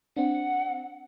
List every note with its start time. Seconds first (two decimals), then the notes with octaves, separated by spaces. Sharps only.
0.16 C4 D4 F#5